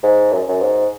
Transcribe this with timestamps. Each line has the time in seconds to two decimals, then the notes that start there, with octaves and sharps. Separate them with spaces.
0.03 G#2
0.32 F#2
0.48 F#2
0.61 G#2